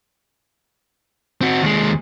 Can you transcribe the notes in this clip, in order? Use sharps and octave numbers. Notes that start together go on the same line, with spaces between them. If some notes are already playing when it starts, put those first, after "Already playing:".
C4 F#4
D#2 G#3